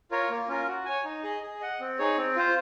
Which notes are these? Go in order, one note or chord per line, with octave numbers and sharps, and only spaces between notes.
F4 A#4 C#5
A#3
C#4 F4 A#4
F#4
C#5 G#5
D#4
G#4 D#5
G#4
D#5 F#5
C4
D#4 G#4 C#5
C4
F4 C5